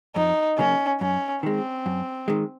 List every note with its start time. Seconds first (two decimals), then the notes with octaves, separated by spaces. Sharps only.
0.16 F2 D#4
0.58 C#3 F#3 A#3 C#4
1.01 F#2 C#4
1.43 D#3 G#3 C4
1.86 F#2
2.28 D#3 G#3